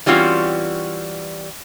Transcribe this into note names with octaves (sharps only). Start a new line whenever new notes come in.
E3 G3 C4 C#4 F4 F#4